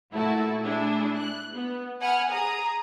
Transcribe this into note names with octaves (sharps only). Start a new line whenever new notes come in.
A#2 A3 E4 F#4 A5
A3 D4 E4 G#4
F#6
B3
F#5 G#5 B5 F6
G#4 A#5 D#6